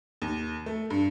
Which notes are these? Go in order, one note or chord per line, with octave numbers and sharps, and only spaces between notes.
D#2
A3
G2